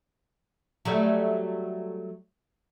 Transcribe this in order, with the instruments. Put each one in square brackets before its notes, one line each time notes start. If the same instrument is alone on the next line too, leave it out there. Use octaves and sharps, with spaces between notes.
[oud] F#3 G3 A3